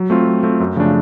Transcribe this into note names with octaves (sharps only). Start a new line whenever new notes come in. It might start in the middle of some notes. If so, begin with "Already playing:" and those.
Already playing: F#3
A3 C4 F4
F#3
A3 C4 F4
F#2
C#3 F3 A3 D4